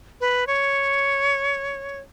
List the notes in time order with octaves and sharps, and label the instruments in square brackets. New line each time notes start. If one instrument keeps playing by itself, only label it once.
[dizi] B4
C#5